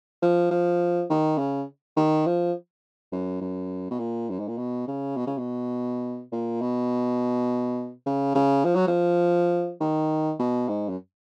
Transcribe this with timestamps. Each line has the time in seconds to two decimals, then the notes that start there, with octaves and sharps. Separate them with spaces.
0.22 F3
0.51 F3
1.10 D#3
1.38 C#3
1.97 D#3
2.26 F3
3.12 F#2
3.41 F#2
3.91 B2
3.99 A#2
4.30 F#2
4.40 G#2
4.48 A#2
4.58 B2
4.88 C#3
5.17 B2
5.27 C#3
5.38 B2
6.32 A#2
6.61 B2
8.07 C#3
8.35 C#3
8.65 F3
8.75 F#3
8.88 F3
9.81 D#3
10.39 B2
10.69 G#2
10.89 F#2